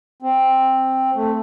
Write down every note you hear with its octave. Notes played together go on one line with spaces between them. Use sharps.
C4
A3